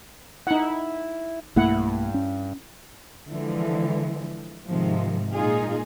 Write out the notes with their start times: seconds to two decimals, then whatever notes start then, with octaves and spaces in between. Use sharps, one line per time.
0.47 D#4 E4 F#5
1.56 B1 G2 A3 A#3 E4 F#5
2.14 C#4
3.30 D3 E3 F3 G#3
4.70 G#2 C3 D#3 F3 G#3
5.33 A#2 G#3 D#4 F4 G#4